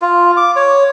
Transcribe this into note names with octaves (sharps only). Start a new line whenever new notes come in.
F4
D6
C#5